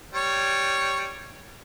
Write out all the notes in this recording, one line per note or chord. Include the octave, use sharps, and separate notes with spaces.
G3 C#5